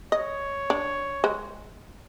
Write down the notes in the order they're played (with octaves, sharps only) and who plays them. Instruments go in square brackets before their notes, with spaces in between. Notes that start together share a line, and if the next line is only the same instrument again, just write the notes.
[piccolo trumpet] C#5 [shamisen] D#5
[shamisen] D4
G#3 C5